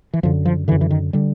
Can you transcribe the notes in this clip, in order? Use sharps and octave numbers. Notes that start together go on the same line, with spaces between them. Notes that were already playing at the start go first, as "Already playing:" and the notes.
E3
F#2 D3 F3
F3
F#2 D3 E3
E3
D#3
D3 G3